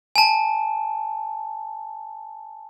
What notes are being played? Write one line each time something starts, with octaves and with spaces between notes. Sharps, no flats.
G#5 A5